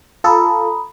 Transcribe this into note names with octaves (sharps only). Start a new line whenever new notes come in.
F4 A4 A#5 B5 D#6